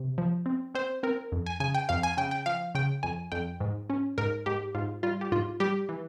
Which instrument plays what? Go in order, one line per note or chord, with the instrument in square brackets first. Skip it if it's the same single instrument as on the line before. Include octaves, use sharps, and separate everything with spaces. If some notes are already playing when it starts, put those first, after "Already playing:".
Already playing: [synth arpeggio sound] C3
F3
C4
C4 C5
C4 A#4
F2
G#5
C#3 G#5
G5
F2 F5
G#5
C#3 G5
G5
F3 F5
C#3 G5
F2 G#5
F2 G5
G#2
C#4
G#2 A#4
G#2 G4
G#2 F4
G3 F4
G4
G#2 F4
G3 G4
E3